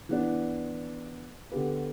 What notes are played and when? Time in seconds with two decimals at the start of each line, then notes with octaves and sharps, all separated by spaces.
0.09 E3 B3 D4
1.52 D3 B3 G4 B4